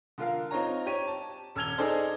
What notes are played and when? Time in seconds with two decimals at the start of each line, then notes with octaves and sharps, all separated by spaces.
0.18 D3 F4 A#4 F5
0.51 C4 D#4 F4 C#5 A#5
0.86 G4 C#5 D#7
1.07 A5
1.56 D#1 E6 F6 G#6 F7 G7
1.78 D#4 G#4 A4 C5 D5